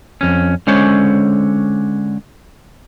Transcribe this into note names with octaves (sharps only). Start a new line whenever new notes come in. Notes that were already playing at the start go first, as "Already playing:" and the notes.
F2 C#4
D3 G#3 C#4 C5 C#5